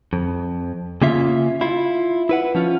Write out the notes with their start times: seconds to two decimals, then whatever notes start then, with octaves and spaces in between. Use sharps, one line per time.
0.13 F2
1.02 C#3 A#3 C#4 F4 E5
1.61 E4 F4
2.29 E4 B4 F#5
2.55 F3 C#4 F4